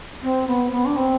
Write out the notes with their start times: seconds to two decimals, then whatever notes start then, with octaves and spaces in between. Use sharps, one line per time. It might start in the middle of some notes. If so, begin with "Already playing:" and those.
0.22 C4
0.47 B3
0.72 B3
0.86 D4
0.96 C4